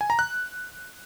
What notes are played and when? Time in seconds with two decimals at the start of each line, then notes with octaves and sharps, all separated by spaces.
0.01 G#5
0.10 A#5
0.19 F#6